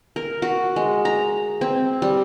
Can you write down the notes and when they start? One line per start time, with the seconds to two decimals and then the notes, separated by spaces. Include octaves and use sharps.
0.16 A#4
0.42 F#4
0.76 G#3
1.05 A#5
1.61 C4
2.02 G3